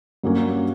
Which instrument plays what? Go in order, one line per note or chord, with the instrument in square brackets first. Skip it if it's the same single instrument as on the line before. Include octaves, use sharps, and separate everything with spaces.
[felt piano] G2 F#3 A#3 C#4 F#4